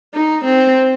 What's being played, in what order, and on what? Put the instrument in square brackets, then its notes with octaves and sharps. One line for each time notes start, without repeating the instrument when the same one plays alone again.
[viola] D#4
C4